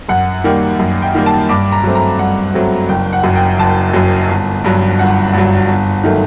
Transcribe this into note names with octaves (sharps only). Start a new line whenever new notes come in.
F#2 F#5
D#3 G3 A#3
F#2
G5
D#3 G3 A#3
A5
G2 D6
A#5
F#3 A3 C4
A#5
G2 F#5
F#3 A3 C4
F#1 G5
F#5
F#2 F#3
G5
F#1 A5
F#2 F#3
G1
G2 F#3
G1 F#5
G2 F#3
G1
D#3 F#3 A3